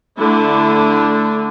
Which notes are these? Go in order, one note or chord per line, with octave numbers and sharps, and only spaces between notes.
D3 A3 D4 E4